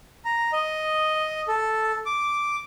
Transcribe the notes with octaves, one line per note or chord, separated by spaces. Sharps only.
A#5
D#5
A4
D6